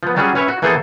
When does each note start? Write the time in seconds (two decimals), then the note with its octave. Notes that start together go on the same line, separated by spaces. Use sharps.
0.03 F3 B3
0.16 F#3 G3 C#4 F4 F#4 G#4
0.35 C#4 B4 C#5 E5
0.48 F#4
0.62 E3 A#3 B3 G#4 A4 C5